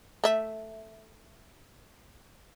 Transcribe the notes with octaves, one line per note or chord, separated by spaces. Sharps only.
A3 E5